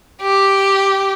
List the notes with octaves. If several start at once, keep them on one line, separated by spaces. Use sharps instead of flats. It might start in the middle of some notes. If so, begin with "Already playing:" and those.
G4